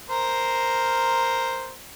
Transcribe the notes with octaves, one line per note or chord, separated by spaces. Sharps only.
A#4 C5